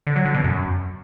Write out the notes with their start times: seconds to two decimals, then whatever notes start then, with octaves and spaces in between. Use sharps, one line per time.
0.07 D3
0.16 F#3
0.25 D3
0.35 B2
0.44 F#2